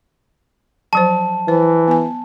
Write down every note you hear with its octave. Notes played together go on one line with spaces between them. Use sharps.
F3 F#3 C5 A5
E3 C5
B3 G#5